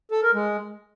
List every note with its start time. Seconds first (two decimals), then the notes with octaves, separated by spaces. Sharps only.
0.11 A4
0.23 A#4
0.34 G#3